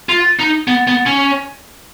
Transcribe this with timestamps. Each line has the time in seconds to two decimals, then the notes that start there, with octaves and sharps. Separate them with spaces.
0.09 F4
0.39 D#4
0.67 B3
0.87 B3
1.06 C#4